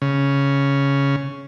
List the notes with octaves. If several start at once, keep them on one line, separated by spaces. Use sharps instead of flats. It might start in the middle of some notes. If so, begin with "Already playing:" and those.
C#3